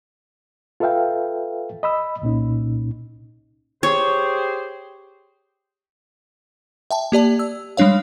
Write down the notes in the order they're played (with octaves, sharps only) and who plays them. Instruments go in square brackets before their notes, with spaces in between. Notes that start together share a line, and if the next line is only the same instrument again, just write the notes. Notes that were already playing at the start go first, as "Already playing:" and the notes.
[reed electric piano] F4 A4 B4 E5 F5 G5
D#5 B5 E6
C2 A#2 C#4 D#4
[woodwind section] G4 G#4 C5 [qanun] C#5
[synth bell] E5 G5 A5
A#3 G4 D5 A5
E6
G3 G#3 D4 C#5 F5